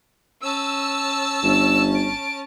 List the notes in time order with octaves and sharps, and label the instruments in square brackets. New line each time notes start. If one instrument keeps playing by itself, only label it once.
[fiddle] C#4 A5 [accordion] E6
[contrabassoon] G1 [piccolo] E7
[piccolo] D7